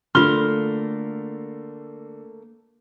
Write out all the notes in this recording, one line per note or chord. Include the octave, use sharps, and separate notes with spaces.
D3 A3 A#3 F4 C6 F6 G7